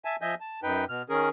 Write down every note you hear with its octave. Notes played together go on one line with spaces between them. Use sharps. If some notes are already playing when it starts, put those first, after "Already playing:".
E5 G#5 A5
F3 D#5 E5 G#5 G6
A5
F#2 D#4 B4 G5
B2 F6
D#3 C#4 G#4 A#4